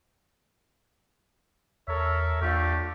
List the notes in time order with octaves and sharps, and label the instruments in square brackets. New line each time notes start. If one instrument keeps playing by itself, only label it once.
[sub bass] E2 [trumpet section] A4 A#4 C#5 [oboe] E5
[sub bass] E2 [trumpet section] A3 D4 F4 [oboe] G4